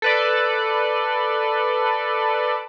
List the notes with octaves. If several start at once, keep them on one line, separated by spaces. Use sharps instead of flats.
A4 B4 D5